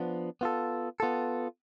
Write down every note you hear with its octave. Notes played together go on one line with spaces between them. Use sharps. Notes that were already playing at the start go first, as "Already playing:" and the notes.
Already playing: F3 B3 D4
B3 F4 A4
B3 F4 A4